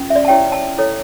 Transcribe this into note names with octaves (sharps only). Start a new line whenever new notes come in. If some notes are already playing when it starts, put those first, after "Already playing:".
Already playing: C#4 F4
E5
D5
A5
E4 G4 C#5 G5
A5
E4 A4 C#5